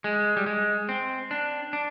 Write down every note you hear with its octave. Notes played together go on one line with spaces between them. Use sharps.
G#3
G3
G#3
C4
D4
D4